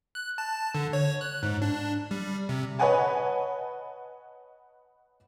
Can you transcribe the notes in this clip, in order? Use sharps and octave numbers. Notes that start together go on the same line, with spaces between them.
F#6
A5
D3
C#5
F#6
G#2
D4
G3
C3
B4 C#5 D#5 F#5 G#5 A5